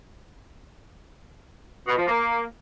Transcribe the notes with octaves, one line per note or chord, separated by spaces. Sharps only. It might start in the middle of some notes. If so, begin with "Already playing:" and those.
B2
F3
A#3